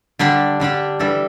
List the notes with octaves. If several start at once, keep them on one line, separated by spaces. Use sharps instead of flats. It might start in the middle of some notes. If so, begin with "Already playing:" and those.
D3 G3 D4 G4
D3 G3 D4 G4
E3 G3 D4 A4